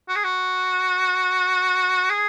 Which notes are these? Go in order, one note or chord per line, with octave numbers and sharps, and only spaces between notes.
F#4
G#4
F#4
G#4